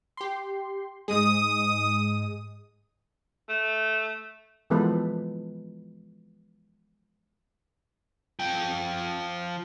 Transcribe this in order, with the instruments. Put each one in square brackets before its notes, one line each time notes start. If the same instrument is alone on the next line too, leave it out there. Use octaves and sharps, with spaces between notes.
[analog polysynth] G4 C6
[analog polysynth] G#2 G#3 [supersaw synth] D#6
[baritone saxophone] A3
[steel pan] E3 F3 G#3 B3 A4 B4
[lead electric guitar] F3 G5